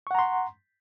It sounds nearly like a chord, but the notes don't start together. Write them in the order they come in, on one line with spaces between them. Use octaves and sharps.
C#6 F#5 A#5 C6